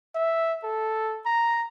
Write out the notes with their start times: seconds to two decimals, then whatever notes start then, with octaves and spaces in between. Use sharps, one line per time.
0.15 E5
0.63 A4
1.25 A#5